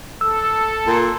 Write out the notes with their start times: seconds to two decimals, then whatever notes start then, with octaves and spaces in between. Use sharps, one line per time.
0.21 A4 E6
0.87 A#2